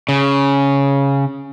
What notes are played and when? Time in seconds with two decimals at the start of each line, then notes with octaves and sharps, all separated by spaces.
0.09 C#3